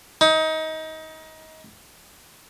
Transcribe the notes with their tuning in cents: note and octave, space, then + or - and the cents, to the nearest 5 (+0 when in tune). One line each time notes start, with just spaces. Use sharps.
D#4 +25